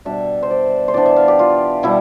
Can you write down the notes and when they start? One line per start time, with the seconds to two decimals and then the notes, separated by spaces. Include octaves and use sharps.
0.05 B2 G3 D4 E5
0.43 C5
0.51 D5
0.88 C5
0.94 E3 B3 D4 D5
1.06 E5
1.16 F5
1.28 G4
1.39 F4
1.83 B2 G3 E4